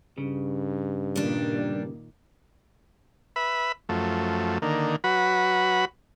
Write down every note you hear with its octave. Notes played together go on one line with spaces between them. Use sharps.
G2 C#3
A#2 D#3 G3 A#3 D4
B4 E5 B5
F#2 F3 A3
D3 D#3 A#3
F#3 F#4 B4 B5